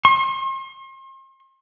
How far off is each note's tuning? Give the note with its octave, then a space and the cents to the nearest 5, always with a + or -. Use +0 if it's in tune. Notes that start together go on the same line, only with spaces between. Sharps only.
C6 +40